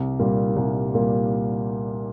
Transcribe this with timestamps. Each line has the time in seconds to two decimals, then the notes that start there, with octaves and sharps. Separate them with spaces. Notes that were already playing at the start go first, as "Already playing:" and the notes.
Already playing: C2
0.19 A#2 G3 A#3
0.56 C2
0.94 A#2 G3 A#3